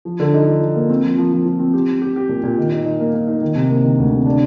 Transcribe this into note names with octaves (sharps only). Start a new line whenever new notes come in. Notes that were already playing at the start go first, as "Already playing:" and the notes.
F3
D3
D#4
F3
F3
A#3
C4
F3
F3
F3
F3
C4
G4
G4
G4
G4
A#2
A#2
D#3
D#4
D#4
A#3
A#3
D#4
D#3
C3
A#3
D#3
D2
C3
D4